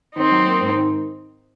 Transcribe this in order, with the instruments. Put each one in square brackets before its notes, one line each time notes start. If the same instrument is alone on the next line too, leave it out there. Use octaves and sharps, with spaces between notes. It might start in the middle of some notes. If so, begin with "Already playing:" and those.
[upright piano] D#3 [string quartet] C4 D#4
[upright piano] F#3
A#3
G#2
D#3